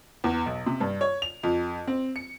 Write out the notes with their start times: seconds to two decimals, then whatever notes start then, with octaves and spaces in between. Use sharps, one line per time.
0.24 E2
0.46 B1
0.66 C3
0.80 G2
1.01 C#5
1.22 F7
1.43 F2
1.87 C4
2.16 C#7